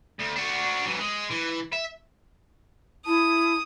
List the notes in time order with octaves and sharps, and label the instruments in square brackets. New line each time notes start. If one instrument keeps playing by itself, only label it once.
[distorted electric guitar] D2
D4 F#4
E3 F#3
G#3
E3
E5
[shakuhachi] E4 [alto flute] A5 [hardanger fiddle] D#6